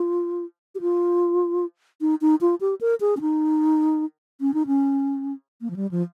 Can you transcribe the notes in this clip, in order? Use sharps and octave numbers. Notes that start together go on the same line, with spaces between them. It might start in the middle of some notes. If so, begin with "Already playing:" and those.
Already playing: F4
G4
F4
D#4
D#4
F4
G4
A#4
G#4
C#4
D#4
C#4
D#4
C#4
A#3
F3
G3
F3